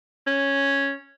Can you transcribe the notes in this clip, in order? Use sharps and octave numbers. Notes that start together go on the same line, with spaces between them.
C#4